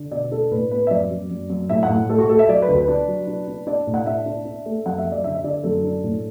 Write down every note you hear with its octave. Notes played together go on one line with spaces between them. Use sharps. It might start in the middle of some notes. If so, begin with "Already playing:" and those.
Already playing: D3
B2 D5
D4 A4
A2 B4
B3 B4
E5
F#2 D5
F#2
F#2
F#2
A2 E5
F#5
A2
A3 A4
F#4
A3 A4
E5
F#3 D5
B4
D2
B4
D4
F#3
D4
D4
D4 D5
A2
F#5
D4 E5
D4
D4
A3
F#2 F#5
E5
F#2
D5
D3 E5
E5
D3 D5
F#2 A4
D4
A2